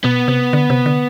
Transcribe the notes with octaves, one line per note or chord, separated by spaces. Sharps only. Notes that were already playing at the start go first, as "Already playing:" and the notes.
B2 B3
C3
D3
C3
D3